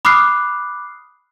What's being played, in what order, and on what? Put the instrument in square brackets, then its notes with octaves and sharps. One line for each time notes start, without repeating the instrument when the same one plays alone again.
[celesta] B5 D6 D#6 F6 F#6 C7